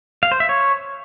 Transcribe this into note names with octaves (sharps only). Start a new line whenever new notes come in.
F5
C5
E5
C#5